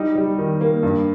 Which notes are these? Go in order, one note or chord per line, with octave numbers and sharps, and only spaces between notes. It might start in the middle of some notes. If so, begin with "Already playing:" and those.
Already playing: G3 D#4
G3
D#3
A#3
G2